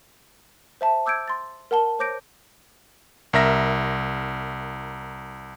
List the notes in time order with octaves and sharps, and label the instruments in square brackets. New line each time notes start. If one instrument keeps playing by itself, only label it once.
[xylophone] C5 E5 A5
D6 E6 G6 G#6 D7
C6 A6
A#4 F#5 A5 G7
C5 C#5 D6 G6 A#6 D7
[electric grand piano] C2 A#4 E5 A#6